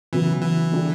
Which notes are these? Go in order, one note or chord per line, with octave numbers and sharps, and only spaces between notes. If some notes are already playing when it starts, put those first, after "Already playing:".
C#3 E3 F#3 B3
E3
D3 G3 D4